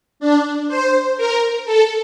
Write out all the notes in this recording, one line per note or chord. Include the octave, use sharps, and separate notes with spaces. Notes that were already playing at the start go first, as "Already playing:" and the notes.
D4
C5
A#4
A4